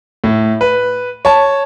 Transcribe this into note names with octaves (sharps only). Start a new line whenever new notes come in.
A2
B4
C#5 A5